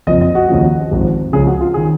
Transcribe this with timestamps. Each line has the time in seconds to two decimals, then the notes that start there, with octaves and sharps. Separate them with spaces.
0.07 F#1 F2 F3 D#5
0.21 D#5
0.35 F#4
0.48 D#2 C#3 F3
0.91 G#1 G#2 F3
1.33 C#2 C#3 F3 G#4
1.47 F#4
1.61 F4
1.74 D#3 G#4